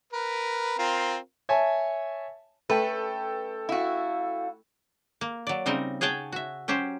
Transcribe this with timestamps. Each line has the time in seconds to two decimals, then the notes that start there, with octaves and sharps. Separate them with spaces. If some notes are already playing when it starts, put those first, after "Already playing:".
0.13 A#4 B4
0.79 C4 F4 A#4
1.49 C#5 E5 G#5 A5
2.70 A3 C#4 A4 B4 G5
3.69 E4 F#4 F5
5.21 A#3
5.47 F#3 D5
5.66 C#3 G3 C4 D#4 A#4
6.01 G#4 C#5 F#5 G5 A5
6.32 F#4 E5
6.68 F#3 C#4 G4 C5